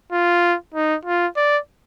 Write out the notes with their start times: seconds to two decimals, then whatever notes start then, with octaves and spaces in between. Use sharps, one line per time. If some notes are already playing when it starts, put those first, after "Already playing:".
0.12 F4
0.74 D#4
1.05 F4
1.36 D5